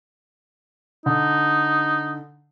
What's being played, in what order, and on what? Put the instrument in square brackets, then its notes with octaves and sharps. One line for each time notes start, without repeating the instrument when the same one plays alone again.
[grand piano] D3 [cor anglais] D#4